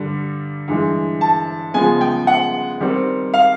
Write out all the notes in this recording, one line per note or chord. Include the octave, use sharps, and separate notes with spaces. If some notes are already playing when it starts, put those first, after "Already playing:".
Already playing: G2 D3 G3
G2 E3 G#3
A5
C#3 F3 G#3 B3 G#5
G5
F#5
D#3 G3 C4
F5